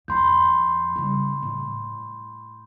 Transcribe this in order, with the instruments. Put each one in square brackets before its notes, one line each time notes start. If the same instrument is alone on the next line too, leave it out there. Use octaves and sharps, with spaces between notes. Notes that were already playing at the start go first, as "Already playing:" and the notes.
[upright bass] F2 [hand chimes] B5 C6 G6
[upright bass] C#3 G3
A2